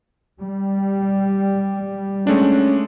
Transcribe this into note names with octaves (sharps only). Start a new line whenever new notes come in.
G3
G#3 A3 C#4 D4